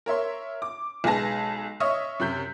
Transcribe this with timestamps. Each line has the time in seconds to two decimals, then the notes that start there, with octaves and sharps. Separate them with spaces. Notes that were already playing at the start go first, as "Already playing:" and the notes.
0.06 A#4 C#5 E5 C6
0.62 D6
1.04 B1 G#3 B4 G#5 A5 A#6
1.80 C#5 D#5 E5 C#6 D#6 F6
2.20 F#2 C3 F#6 G6 B6